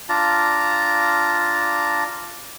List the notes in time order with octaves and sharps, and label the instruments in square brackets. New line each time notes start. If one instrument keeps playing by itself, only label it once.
[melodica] D4 F4 A5 A#5